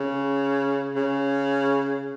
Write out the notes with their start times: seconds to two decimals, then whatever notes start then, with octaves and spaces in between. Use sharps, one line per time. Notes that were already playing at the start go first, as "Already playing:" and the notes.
Already playing: C#3
0.95 C#3